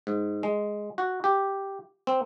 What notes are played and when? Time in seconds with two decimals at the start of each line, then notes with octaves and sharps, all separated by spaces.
0.07 G#2
0.43 G#3
0.98 F#4
1.24 G4
2.07 C4